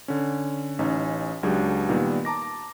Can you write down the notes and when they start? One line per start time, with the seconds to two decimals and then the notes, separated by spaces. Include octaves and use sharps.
0.08 D3 C#4
0.79 A1 C#4 D#4
1.43 C#2 F#3 D4 G4 G#4
1.89 A#2 D#3 G3 B3
2.25 A5 A#5 D6 A#6